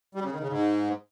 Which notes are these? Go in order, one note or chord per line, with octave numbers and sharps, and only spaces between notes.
G3
C#3
D#3
C#3
G#2